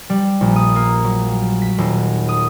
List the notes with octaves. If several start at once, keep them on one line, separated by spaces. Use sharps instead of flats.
G3
A#1
D#6
A#3
F#3
B6
D#1
D#6